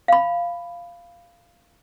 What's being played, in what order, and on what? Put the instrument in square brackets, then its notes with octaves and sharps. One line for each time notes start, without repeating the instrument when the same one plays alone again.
[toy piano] F5 B5